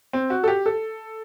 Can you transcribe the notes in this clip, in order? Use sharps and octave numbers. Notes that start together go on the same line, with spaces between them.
C4
F#4
A4
G4
A4